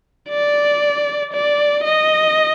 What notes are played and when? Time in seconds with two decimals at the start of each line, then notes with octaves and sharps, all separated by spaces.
0.29 D5
1.33 D5
1.85 D#5